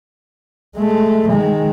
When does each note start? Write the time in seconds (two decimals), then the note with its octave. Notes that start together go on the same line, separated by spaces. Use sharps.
0.76 G#3 A3
1.28 D#3 G#3